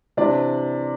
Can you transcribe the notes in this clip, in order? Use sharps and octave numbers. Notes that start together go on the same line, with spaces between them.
C3 E3 D4 D5